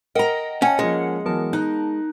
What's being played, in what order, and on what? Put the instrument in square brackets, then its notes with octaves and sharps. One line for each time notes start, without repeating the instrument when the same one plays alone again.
[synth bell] A#4 F#5 G5 [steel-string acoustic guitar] D#5 A#5
[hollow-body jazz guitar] C#4 [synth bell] F#5 C#7 [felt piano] G5 A5
[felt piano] F3 A#3 C#4 [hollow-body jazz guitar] G#3
[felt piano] E3 F#3 [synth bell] B3 A#4 A5
[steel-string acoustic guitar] D#4 [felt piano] F#6